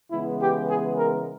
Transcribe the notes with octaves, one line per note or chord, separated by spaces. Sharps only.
C#3 E3 G#3 B3 E4
G4
G#4
A#4